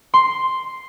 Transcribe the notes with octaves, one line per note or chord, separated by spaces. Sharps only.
C6